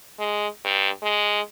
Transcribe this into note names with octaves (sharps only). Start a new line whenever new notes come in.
G#3
G2
G#3